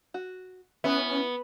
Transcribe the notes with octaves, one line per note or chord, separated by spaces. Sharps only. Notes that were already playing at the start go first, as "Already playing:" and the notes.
F#4
B3 C#4 E4 B4 E5